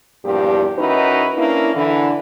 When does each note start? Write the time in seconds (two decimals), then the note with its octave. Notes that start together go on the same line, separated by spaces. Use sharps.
0.25 E2 G2 A#2 F3 G4
0.77 D#3 C#4 D#4 E4 F#4 B4
1.36 A#3 C#4 D4 E4
1.74 D3 E3